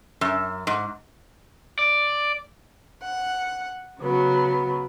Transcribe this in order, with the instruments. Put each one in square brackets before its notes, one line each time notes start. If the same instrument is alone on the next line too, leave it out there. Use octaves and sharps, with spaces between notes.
[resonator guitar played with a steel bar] F#2
G#2
[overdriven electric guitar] D5
[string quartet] F#5
C#3 F#3 B3